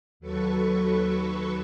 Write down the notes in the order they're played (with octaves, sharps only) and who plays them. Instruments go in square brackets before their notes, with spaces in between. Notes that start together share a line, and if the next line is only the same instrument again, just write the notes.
[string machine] D#2 F#3 A4 B4 C#6